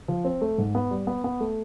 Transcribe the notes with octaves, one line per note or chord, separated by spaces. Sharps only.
F3
C4
A3
G#2
B3
G3
B3
B3
A3